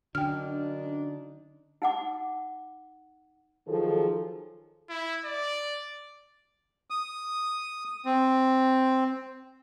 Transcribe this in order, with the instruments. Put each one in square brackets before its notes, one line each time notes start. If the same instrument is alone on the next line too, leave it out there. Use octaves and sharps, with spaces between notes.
[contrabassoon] F#2 [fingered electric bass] D3 [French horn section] D4 D#4 [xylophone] G5 F6
[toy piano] D#4 F#5 D6
[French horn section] D#3 F3 F#3 G#4 A4
[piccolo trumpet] E4
D5
[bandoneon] D#6
C4